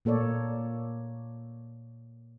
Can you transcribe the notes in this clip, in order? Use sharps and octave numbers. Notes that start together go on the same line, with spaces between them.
A#2 A#3 A4 C#5 D5